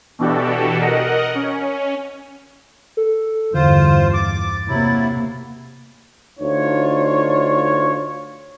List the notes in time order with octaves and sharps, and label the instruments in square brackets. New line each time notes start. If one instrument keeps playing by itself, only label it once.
[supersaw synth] B2 E3 D4 F#4 G4 A4
A#4 D#5 F#5
C#4
[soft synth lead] A4
[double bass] E2 G2 [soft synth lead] D3 [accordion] F4 C5
[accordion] D6 [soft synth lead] A6
[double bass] C3 A#3 [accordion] F#3 E4
[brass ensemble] D2 D4 D#4 F4 C#5